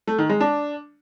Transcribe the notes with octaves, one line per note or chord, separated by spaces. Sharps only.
A3
D#3
G#3
D4